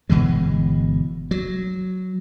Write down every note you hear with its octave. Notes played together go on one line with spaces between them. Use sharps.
G1 B2 E3 G#3
F#3